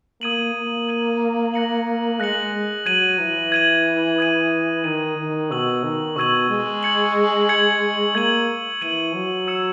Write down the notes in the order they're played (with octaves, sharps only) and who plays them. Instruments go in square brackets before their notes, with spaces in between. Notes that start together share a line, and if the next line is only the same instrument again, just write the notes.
[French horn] A#3 [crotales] D#6 G#6 D#7 F#7
[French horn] A#3
[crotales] D#6 G#6 D#7 F#7
F#6 A#6 C#7 F#7
[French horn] G#3 [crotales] F#6 A#6 C#7 F#7
[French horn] F#3 [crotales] G#6 D#7 F#7
[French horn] E3
[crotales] G#6 D#7 F#7
D#6 G#6 D#7
[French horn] D#3 [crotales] D#6 G#6 D#7
[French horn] D#3
[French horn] B2 [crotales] C#6 E6 G#6 D#7 F#7
[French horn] D#3
[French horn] B2 [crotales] C#6 E6 G#6 D#7 F#7
[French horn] G#3
[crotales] G#6 C#7 F#7
G#6 C#7 F#7
[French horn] A#3 [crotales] G#6 D#7 F#7
[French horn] E3 [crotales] G#6 D#7 F#7
[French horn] F#3
[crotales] E6 G#6 C#7 E7